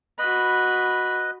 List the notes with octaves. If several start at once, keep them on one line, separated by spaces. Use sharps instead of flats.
F#4 B4 D#5 B5